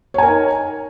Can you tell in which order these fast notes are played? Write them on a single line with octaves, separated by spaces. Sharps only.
C#5 G#5 A#4 D#4